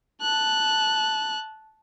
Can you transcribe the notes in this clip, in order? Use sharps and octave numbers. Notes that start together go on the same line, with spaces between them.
A5 F#6